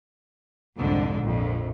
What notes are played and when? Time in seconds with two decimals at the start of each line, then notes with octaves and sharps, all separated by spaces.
0.79 C2 F2 G#2 D3
1.20 A#1 F2